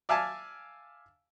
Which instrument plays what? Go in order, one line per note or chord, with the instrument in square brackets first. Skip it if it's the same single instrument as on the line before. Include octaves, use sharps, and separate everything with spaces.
[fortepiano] D5 E5 F5 G#5 A5